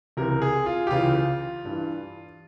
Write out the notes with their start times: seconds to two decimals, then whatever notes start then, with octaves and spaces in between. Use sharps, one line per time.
0.17 C#2 C3 E3 A#4
0.42 G#4
0.66 F4
0.87 G4
0.91 C#2 C#3 E3 F4
1.65 G2 E3